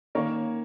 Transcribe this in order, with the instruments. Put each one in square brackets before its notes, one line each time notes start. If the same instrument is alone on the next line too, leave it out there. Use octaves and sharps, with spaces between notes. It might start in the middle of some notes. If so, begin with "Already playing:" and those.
[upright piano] D#3 A#3 C#4 A#4 C#5